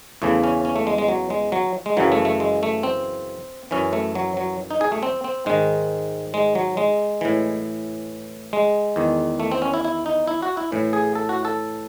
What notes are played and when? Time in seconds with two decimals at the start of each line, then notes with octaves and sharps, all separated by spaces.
0.22 E2 C#3 E3 A3
0.44 C#4
0.65 C#4
0.76 A3
0.87 G#3
0.98 G#3
1.08 F#3
1.30 G#3
1.52 F#3
1.86 G#3
1.97 F#2 C#3 E3 F#3
2.12 A3
2.25 A3
2.40 G#3
2.63 A3
2.83 C4
3.71 F#2 E3 C#4
3.93 A3
4.15 F#3
4.37 F#3
4.71 D#4
4.81 G#4
4.92 A3
5.03 C4
5.24 C4
5.46 G#2 D#3 G#3
6.34 G#3
6.55 F#3
6.77 G#3
7.21 A2 E3
8.53 G#3
8.96 E2 D#3
9.40 A3
9.52 C4
9.62 C#4
9.74 E4
9.85 E4
10.06 D#4
10.27 E4
10.42 F#4
10.57 E4
10.72 A2 E3
10.93 G#4
11.15 A4
11.29 F#4
11.45 A4